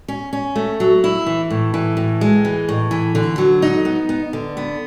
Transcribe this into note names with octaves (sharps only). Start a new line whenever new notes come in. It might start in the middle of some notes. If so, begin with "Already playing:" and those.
C#4
C#4
A3
F#3
E4
E3
A2
E3
A2
G#3
E3
A2
E3
D3
F#3
D#4
B3
B3
D3
B3